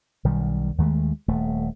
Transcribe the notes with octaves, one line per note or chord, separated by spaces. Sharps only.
B1 D#3 G3
D#2 D#3 G#3 A3
D#1 A3